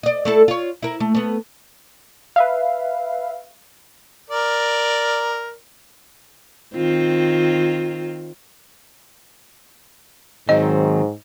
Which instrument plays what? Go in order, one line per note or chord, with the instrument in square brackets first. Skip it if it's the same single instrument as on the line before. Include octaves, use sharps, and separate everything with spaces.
[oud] D5 D#5
A3 E4 A4
F4 C#5
E4 A#4
A3
A3 B3
[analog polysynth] B4 E5 F5
[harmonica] A#4 D5
[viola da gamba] D#3 C4 F4
[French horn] G#2 [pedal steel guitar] D#3 F#3 C4 [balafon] D#5